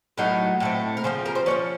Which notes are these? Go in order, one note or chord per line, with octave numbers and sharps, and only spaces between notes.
A2 F#3 A3 D#4 A#4
A2 A3 C4
A#4
C#3 F3 C4 C5
A#4
C5
F3 A#3 C#4 C#5